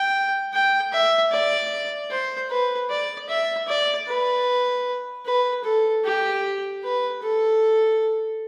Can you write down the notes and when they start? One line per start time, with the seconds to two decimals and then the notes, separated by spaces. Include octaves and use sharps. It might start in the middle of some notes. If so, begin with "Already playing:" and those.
Already playing: G5
0.53 G5
0.92 E5
1.32 D5
2.10 C5
2.49 B4
2.90 D5
3.29 E5
3.68 D5
4.07 B4
5.26 B4
5.64 A4
6.04 G4
6.83 B4
7.22 A4